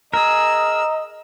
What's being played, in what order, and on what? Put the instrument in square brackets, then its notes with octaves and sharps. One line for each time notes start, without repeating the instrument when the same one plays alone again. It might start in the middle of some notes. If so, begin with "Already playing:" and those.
[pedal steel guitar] G#4 A#4 [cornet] D#5 [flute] A#5 [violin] E6